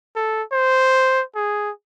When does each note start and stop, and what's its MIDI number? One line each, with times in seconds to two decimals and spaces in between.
0.16 0.42 69
0.52 1.23 72
1.35 1.71 68